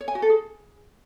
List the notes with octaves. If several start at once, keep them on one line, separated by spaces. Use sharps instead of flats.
C#5
G#5
F#4
A4
G#4